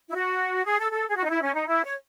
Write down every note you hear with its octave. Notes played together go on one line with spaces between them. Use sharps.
E4
F#4
G#4
A4
A4
G#4
F#4
D#4
E4
C#4
D#4
E4
C#5